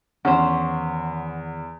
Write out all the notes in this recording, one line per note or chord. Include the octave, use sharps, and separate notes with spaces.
E2 D#3 C#4 C5 F#5